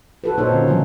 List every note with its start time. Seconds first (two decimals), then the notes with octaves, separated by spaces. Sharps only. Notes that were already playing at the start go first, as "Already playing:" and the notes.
0.24 F#4 A4 B4
0.38 A#2 A#3 D#4 A4 C5 C#5
0.52 D3 C4 C#4
0.67 C#3 F3 F#3 A3 B3